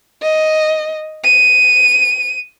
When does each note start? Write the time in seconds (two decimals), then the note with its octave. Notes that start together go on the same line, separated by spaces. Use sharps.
0.22 D#5
1.24 D#7